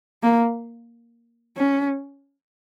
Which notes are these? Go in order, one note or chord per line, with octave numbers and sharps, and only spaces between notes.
A#3
C#4